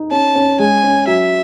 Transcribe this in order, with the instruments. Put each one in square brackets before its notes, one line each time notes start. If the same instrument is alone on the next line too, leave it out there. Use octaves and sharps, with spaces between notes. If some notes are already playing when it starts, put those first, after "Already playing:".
Already playing: [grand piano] D#4
[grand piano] C#4 [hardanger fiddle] A5
[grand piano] C#4
[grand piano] G#3 [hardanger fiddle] G#5
[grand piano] C#4
[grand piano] F#3 [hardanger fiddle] E5